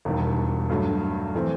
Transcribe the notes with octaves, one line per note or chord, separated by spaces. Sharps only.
E1 D#2 D#3 G3
G2 F#3 A3
E3 A3 C4